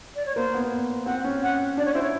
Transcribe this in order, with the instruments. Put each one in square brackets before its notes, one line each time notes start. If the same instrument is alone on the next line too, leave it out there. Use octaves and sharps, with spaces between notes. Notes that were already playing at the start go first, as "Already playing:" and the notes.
[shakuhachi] D5
C#5
[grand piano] A#3 [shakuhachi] C5
[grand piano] B3
[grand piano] C4 [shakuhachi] F#5
[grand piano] C#4
[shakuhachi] F#5
[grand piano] D4 [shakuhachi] D5
[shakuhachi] C#5
[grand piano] E4 [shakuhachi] C5
[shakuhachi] C#5